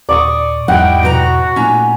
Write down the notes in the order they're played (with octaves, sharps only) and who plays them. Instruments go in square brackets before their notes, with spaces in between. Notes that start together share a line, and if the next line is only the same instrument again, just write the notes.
[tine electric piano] D#2 A#2 [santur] D5 C#6 D#6
[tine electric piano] E2 G#2 [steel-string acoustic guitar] G3 D#4 E4 [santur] F#5 [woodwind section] G5
[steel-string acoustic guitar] B2 E5 A#5 [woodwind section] F#4
[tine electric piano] A#2 A3 D#4 [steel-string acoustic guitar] C#4 A#5